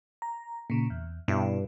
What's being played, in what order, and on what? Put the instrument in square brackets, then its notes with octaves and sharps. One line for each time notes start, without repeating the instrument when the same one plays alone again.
[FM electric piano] A#5
A#2 C#3
E2
[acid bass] G2 [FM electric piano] B2 E4